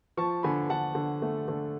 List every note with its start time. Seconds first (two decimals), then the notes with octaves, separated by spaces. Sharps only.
0.17 F3 A5 C#6
0.43 D3 G#5 B5
0.70 D3 F#5 A5
0.95 D3
1.22 A3
1.48 D3